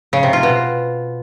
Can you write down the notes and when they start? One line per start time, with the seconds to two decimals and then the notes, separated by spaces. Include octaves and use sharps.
0.13 C#3
0.23 C3
0.33 F4
0.43 B2